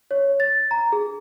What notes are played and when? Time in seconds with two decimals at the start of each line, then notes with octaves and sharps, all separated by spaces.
0.11 C#5
0.40 A6
0.71 A#5
0.92 G#4